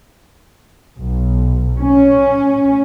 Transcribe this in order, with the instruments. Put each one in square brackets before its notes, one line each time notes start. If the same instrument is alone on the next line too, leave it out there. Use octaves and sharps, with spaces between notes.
[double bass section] B1
C#4